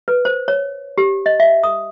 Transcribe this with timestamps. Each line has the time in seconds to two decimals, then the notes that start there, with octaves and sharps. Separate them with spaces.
0.08 B4
0.25 C5
0.48 C#5
0.98 G4
1.26 D#5
1.40 E5
1.63 D#6